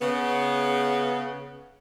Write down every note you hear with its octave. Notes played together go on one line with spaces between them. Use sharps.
C#3 B3